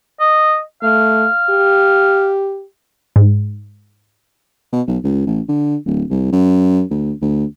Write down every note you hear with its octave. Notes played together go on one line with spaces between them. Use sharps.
D#5
A3 F5
G4
G#2
B2
B1
C#2
A1
D3
D1
C2
F#2
D2
D2